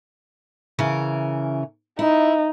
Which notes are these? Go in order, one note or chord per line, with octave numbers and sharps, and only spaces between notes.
C#3 E3 A#4
D#4 E4